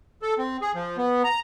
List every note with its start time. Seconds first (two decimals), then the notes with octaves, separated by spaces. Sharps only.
0.22 A4
0.38 C4
0.62 G#4
0.75 F3
0.97 B3
1.24 A#5